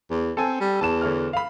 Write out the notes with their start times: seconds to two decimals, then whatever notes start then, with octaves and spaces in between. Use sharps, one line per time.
0.10 E2
0.37 C4 A4 G#5
0.60 G3
0.81 E2 A5 E7
1.02 D3 C#5 F6
1.33 F5 B5